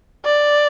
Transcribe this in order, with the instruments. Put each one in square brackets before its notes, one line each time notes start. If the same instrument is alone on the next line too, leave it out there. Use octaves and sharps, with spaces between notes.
[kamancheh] D5